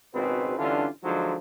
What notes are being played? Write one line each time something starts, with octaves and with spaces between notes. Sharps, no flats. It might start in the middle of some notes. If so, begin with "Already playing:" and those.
G#1 C#2 B2 C4 B4
G2 D3 E3 C#4 D4 F4
D3 F3 F#3 G#3 D#4